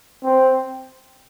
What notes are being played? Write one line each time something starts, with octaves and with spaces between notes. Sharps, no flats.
C4